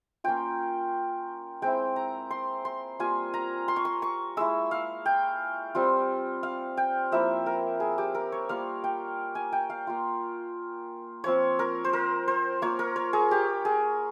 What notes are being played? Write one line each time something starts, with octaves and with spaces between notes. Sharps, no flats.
A#3 C#4 F4 G5
G#3 C4 E4 G5
A#5
C6
C6
G3 A#3 F4 G#5
A#5
C6
C#6
C6
C#6
G#3 E4 E6
F5
G5
G3 C4 F4
F5
G5
F3 A#3 E4 E5
A#4
G#4
G4
A#4
C#5
G3 A#3 F4 F5
G5
G#5
G5
F5
A#3 F4
F3 C4 F4 C#5
A#4
C5
A#4
C5
A#3 F4 C#5
A#4
C#5
G#4
G4
G#4